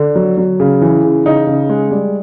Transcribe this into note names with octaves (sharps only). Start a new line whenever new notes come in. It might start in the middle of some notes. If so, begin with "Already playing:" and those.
Already playing: D3
F#3
F#3
C#3
E3
C#3
C#3 D#4
C#3
G#3
G3